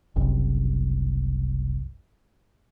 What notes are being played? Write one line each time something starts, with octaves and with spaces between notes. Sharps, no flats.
F#1 C2